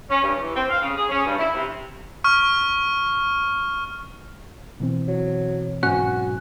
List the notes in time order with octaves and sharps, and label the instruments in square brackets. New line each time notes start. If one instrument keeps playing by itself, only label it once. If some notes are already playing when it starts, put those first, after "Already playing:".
[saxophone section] C#4
G2
E3
C4
F5
C#3
G#4
C#4
G2
E4
C3
[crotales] C#6 F6
[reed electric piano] B2 E3 C4
[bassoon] F#3
[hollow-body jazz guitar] B1 G#2 C#4 [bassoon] F#4 [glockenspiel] F#6